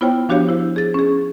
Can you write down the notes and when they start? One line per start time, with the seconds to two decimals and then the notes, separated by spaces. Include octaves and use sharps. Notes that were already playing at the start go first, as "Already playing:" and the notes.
0.01 B3 E4 F4 C5 C#5 G5
0.29 F3 D4 F#4 G4 C#5 F5
0.49 E4 C5
0.76 G#4 A6
0.94 C#4 G#4